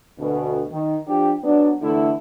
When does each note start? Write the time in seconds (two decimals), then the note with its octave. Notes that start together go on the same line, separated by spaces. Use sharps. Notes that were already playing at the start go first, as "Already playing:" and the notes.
0.19 D2 B2
0.71 D#3
1.07 F3 D4 G4
1.44 F#3 B3 D4
1.82 E2 D3 A3 E4